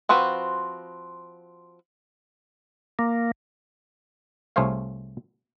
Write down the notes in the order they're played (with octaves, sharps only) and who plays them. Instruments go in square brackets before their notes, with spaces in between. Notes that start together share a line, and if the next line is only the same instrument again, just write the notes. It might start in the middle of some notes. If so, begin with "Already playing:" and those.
[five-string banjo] F3 C4 F#4 B4
[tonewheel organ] A#3
[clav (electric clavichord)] C2 A3 G#4 C5 C#5 F5